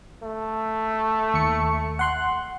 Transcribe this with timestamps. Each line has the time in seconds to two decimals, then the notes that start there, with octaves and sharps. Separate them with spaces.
0.23 A3
1.34 D#2 C#6 C#7
1.99 F#5 C6 F#6